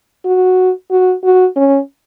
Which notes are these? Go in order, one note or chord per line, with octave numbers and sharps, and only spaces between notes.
F#4
F#4
F#4
C#4